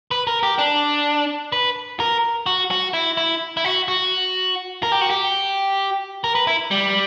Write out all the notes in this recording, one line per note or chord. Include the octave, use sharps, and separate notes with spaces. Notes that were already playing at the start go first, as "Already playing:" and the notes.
B4
A#4
G4
D4
B4
A#4
F#4
F#4
E4
E4
E4
F#4
F#4
A#4
G4
F#4
G4
A#4
B4
E4
G3